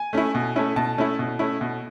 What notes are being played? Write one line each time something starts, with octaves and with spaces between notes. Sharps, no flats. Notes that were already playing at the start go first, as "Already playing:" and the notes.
Already playing: G#5
A3 C#4 E4
B2
A3 C#4 E4
B2 A5
A3 C#4 E4
B2
A3 C#4 E4
B2